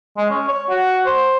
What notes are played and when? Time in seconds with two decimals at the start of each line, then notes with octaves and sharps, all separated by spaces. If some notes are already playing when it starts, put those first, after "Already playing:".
0.17 G#3
0.30 C#4
0.48 C#5
0.70 F#4
1.06 C5